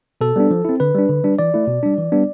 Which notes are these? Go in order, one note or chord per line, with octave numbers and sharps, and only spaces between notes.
B2 A4
G3 B3 D4
F3
C4 E4
D3 B4
G3 D4
D3
G3 D4
E3 D5
A3 E4
B2
G3 D4
E3
G3 B3 D4